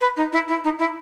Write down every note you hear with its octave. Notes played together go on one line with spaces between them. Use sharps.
B4
D#4
E4
E4
D#4
E4